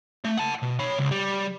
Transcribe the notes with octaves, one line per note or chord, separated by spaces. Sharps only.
A3
F#5 A5
B2
C#5 B5
C#2
G3